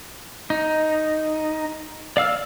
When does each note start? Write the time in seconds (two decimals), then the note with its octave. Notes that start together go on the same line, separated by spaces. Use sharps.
0.50 D#4
2.17 D5 F5 E6 F6